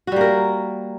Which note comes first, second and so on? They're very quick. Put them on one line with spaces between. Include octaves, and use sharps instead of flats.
F#4 G3 A#3 A#4